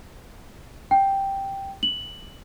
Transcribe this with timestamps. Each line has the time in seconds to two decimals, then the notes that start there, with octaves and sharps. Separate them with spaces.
0.91 G5
1.83 F#7